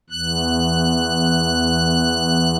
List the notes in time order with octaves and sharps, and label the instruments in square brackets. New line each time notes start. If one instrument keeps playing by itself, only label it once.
[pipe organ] E2 F#6